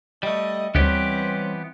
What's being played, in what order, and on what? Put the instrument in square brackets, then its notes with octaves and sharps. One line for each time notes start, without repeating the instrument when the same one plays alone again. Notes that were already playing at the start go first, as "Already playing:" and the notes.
[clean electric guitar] G3 A3 [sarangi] D#5
[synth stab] D2 [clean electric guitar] E3 B3 G4 [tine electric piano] G3 C#5 F#6 [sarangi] C4